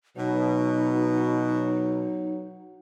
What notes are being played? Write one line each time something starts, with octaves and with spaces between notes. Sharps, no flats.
B2 F#3 D#4